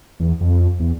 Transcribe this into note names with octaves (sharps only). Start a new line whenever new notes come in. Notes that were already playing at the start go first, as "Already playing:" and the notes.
E2
F2
E2